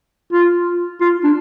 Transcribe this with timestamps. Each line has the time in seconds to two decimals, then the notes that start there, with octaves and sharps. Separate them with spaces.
0.33 F4
1.01 F4
1.24 D4